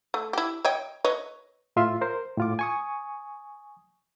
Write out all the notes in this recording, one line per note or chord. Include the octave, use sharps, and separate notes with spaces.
A3
E4 G4
C#5 D#5 G5
B4 C#5 D#5
A2 F4 E5 C6
A#4 C5
A2 F4 D6
G#5 C#6 D#6